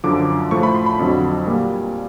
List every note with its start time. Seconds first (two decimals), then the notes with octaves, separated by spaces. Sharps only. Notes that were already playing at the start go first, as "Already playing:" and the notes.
0.04 F#2 D3 F3 D6
0.51 A2 F3 A3 C#6
0.63 B5
0.75 C6
0.86 B5
0.99 F2 D3 F#3
1.47 A#2 G3 A#3